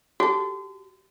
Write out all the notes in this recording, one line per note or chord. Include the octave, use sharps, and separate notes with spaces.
F#4 G4 A4